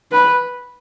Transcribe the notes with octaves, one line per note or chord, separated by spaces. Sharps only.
B4